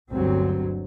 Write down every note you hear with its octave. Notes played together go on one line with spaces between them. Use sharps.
G1 D2 G2 F#3 C4